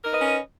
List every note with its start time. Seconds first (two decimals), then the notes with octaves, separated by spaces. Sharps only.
0.02 A#4
0.06 D#4
0.10 B4
0.14 D#5
0.19 C#4